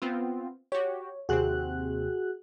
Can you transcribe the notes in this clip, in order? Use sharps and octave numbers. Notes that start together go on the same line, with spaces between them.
B3 C4 F4
F#4 G4 C#5
D#2 C3 C4 F#4 G#4 F#6